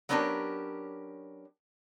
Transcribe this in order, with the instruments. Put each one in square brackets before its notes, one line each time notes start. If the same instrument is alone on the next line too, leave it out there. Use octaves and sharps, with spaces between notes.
[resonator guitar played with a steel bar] F#3 B3 C#4 D4 G4 A#4